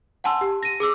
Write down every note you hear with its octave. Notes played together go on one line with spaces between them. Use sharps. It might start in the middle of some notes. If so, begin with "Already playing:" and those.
F#5 G#5 A5 C6 E6
G4
A#6 D#7
G#4 D6 E6